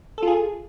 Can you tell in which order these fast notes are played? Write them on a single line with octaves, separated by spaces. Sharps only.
A4 F4 G#4